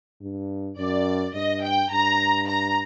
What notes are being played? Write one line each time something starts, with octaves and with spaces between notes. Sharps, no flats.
G2
F#2 D5
G2 D#5
G5
G2 A#5
A#5